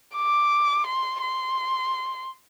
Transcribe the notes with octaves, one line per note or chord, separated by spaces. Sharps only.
D6
C6
C6